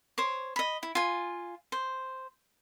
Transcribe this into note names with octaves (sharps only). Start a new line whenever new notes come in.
C5 C#5 D6
D#5 B5
E4
F4 G#5
C5